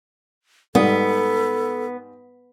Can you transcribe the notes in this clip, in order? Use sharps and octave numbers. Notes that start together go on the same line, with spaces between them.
G#2 G3 B3 A4 D#6